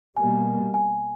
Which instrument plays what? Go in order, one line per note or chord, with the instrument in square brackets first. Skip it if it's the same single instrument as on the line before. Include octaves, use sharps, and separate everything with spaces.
[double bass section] B2 G3 A#3 [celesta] G#5
[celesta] G#5